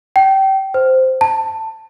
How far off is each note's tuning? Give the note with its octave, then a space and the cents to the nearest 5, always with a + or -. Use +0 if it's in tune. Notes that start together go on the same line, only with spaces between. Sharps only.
G5 -25
C5 -5
A5 +15